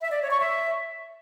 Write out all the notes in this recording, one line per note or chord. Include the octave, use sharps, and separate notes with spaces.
E5
D5
C#5
C#6
E5